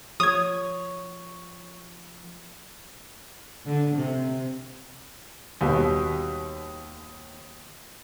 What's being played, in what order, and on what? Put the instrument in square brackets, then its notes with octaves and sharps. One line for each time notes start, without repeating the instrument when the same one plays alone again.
[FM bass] F3 [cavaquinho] C#5 [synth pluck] D#6 G#6
[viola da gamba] D3
C3
[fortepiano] D#2 B2 G3